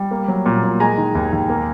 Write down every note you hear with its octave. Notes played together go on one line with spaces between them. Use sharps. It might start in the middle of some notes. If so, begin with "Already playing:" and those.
Already playing: G3
A#3
F#3
A#2
A#2
G#3 G#5 A#5
D#3
D#2
D#2
A#3